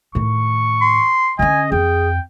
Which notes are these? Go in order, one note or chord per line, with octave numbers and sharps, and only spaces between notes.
A2 D#3 C#6
C6
D3 C#4 D#5 G#5
F2 G#4 G5